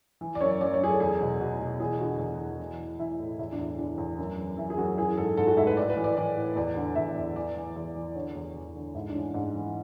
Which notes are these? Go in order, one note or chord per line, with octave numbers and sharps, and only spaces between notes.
E3
D5
F#2 C#5
F#2 D5
C#5
F#2 G#4
A4
E2 G#4
B2
B2
B2
E2 G#4
D3 F#4
E2
E2
E3
E3
E3 E4
A2
E2 E4
D4
E2
E4
E2 D4
E2
F#2
E3
E3 E4
G#4
F#2 F#4
E3 G#4
G#2 A4
G#2 A4
F#4
G#2 E4
B4
A2 D5
B4
E3
D5
E3 D5
A2
E2 D5
D3
E2 E5
E2
E3 D5
E3
E2
E3
D3 C#5
E2
E2
D3
G#2 E4
D4
E3 C#4
G#2 D4
E3